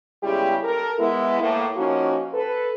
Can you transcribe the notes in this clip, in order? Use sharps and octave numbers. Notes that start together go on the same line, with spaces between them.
C#3 G3 G#3 B3 E4 G4
A4 A#4
G#3 B3 E4
A2 A#3
F3 A#3 C#4 D#4 F#4
A4 B4